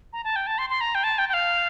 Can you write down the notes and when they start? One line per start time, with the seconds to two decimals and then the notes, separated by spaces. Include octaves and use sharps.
0.13 A#5
0.24 A5
0.36 G5
0.47 A5
0.58 C6
0.70 C6
0.81 A#5
0.95 G5
1.04 A5
1.18 G5
1.29 G5
1.34 F5